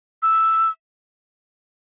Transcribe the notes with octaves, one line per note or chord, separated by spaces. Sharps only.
E6